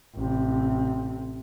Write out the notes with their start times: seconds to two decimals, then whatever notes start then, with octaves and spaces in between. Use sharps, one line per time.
0.15 A1 C3